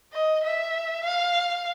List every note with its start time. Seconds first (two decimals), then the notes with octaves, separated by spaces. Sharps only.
0.13 D#5
0.43 E5
1.04 F5